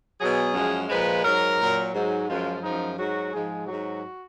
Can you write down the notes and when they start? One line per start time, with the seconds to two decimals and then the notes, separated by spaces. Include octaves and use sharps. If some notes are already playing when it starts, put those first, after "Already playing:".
0.20 B2 F#3 G#4
0.54 F#2 F3 G#3
0.89 A#2 F3 G#3 B4
1.23 G#2 F#3 A#4
1.59 A#2 F#3
1.93 G#2 F#3
2.27 F#2 F3 G#3 F4
2.63 F#2 F3 G#3 D#4
2.98 G#2 F#3 F#4
3.32 G#2 F3 G#3 G#4
3.66 G#2 F#3 F#4